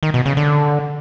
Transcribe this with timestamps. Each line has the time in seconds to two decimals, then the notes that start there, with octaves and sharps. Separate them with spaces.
0.03 D#3
0.14 B2
0.25 C#3
0.37 D3